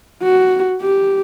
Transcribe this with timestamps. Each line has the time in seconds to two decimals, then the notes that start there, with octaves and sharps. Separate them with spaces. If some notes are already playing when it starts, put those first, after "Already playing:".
0.23 F#4
0.81 G4